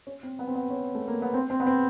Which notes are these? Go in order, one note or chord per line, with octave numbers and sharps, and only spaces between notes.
C#4
C4
B3
C4
B3
C#4
A3
A#3
B3
C4
C4
B3
C4